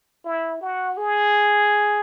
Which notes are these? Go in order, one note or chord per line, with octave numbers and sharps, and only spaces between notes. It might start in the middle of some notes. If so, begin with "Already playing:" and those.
E4
F#4
G#4